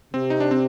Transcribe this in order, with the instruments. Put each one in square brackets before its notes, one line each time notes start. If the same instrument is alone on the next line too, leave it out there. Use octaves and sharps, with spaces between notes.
[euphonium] C3 [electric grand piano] C4
[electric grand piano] D#4
D4
C4